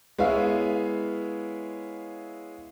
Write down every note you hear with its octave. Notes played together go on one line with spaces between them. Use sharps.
G#3 B3 E4 C#5 E5 F5